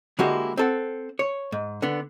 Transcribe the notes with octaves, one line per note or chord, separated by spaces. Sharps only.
D3 G#3 A#3 E4 F#4 G4
C4 A4 F#5
C#5
G#2
D3 B3